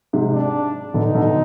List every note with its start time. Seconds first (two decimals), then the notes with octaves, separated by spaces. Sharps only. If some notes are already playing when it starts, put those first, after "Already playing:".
0.13 G#2 C3
0.34 D4
0.94 B2 D3 D#4
1.14 B2 D3